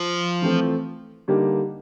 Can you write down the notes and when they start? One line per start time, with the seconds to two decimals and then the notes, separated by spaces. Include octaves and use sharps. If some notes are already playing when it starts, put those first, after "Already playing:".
Already playing: F3
0.42 E3 A3 C4 F4
1.28 D3 G3 A#3 D#4 G4